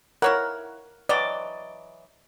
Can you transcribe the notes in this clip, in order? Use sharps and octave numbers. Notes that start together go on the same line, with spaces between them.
E4 A#4 C#5 F#5
E3 F#3 D5 D#5